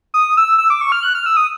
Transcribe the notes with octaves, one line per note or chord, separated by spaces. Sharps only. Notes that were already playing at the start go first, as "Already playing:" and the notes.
D#6
E6
E6
D6
C#6
F6
F#6
F6
E6
D#6